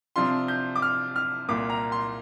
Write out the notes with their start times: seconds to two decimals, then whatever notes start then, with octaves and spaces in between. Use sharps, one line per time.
0.16 C3 F3 D4 F4 C6
0.48 G6
0.76 D6
0.82 F6
1.16 F6
1.48 C2 A#2 A#3 F4 D6
1.70 A#5
1.92 C6